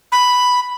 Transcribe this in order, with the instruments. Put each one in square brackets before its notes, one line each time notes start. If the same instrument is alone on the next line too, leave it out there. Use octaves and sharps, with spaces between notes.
[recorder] B5